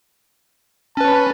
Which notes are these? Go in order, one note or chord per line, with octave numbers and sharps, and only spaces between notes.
C#4 B4 A5